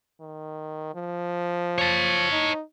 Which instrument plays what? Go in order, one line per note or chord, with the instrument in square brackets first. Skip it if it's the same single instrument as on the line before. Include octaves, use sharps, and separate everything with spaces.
[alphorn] D#3
F3
[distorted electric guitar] C#5 A5
[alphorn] D#4